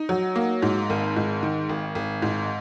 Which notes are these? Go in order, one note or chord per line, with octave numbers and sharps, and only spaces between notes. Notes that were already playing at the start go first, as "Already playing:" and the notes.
Already playing: D#4
F#3
A#3
G#2
G#1
G#2
D#3
G#1
G#1
G#2